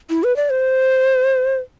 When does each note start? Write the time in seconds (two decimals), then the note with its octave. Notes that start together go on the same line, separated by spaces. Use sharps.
0.10 E4
0.23 B4
0.36 D5
0.50 C5